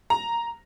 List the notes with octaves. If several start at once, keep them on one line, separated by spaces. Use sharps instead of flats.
A#5